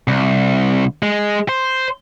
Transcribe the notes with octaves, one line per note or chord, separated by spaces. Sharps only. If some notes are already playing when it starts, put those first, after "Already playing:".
C2
G#3
C5